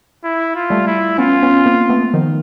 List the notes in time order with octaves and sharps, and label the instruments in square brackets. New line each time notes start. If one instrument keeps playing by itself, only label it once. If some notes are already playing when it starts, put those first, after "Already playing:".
[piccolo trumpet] E4
F4
[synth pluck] G3 A3
[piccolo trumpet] E4
[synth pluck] B3 C#4 [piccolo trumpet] F4
[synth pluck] B3 C#4
A#3 C4
A3 B3
D#3 F3